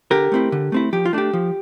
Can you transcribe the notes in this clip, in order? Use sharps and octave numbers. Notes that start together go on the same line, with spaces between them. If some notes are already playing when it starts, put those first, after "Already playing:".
D3 G4 A#4
A3 C4 E4
D3
A3 C4 E4
F3 G4
F4
A3 D4 G4
F3